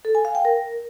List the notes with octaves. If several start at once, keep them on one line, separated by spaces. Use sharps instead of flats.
A4
G#5
F5
G5
A#4